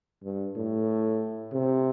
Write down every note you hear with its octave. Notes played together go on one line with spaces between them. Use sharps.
G2
A2
C3